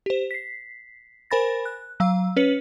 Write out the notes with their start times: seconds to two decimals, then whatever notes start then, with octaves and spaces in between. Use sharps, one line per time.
0.06 G4 C5
0.31 B6 C7
1.31 A#4 C5 G#5 B5 A6 A#6
1.65 F#6
2.00 F#3 F5 E6
2.36 C#4 B4 C#5 C#7 F#7